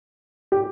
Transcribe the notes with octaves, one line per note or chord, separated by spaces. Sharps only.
G4